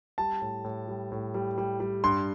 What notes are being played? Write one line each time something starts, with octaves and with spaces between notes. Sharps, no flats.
G3 A5
A2
A2
G3
A2
G3
G3
G3
G2 C6